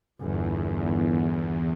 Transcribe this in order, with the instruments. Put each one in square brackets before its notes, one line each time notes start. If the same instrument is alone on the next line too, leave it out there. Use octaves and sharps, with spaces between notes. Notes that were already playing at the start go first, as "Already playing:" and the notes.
[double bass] G1 [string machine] E2